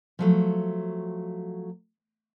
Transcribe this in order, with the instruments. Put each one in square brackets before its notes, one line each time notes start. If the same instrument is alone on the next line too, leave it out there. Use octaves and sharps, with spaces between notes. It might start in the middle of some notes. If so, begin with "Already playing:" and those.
[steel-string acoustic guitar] F3 F#3 A3